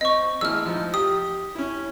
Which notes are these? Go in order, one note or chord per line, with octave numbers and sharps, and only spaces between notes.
C4 D#5 C#6
A1 G#3 E4 E6 F6
F3 D#4
G4 D#6
C#4 E4